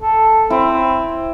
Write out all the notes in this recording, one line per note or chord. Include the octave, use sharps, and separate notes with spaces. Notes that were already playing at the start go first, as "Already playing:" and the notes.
A4
C4 E4